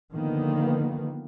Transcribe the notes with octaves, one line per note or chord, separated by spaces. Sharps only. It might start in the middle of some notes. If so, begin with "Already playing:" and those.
D3 D#3 F3 A#3 B3